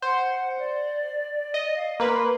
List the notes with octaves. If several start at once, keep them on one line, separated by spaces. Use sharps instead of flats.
C5 F#5
D5
D#5
F5
A#3 B4 C6